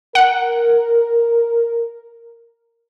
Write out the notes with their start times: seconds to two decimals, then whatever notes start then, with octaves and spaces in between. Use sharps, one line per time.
0.15 A#4 F#5